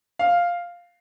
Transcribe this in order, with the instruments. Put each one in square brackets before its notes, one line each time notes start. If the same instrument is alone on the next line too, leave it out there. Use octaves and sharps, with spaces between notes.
[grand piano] F5